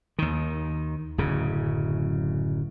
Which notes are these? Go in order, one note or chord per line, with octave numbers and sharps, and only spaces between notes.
D#2 D#3
D1 F#2 C#3